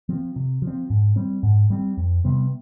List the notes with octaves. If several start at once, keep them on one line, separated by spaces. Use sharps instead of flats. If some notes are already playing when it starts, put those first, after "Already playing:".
F3 C4
C3
F3
C4
G#2
G3 C4
G#2
G3 C4
F2
C3 G3 B3